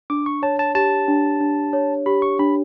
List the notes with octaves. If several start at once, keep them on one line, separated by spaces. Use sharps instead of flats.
D4 D6
C#6
C#5 A5
A5
G4 A5
D4
D4
C#5
G4 B5
C#6
D4 B5